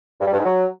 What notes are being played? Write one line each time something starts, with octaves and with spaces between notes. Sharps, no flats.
G2
G3
G2
G#2
F#3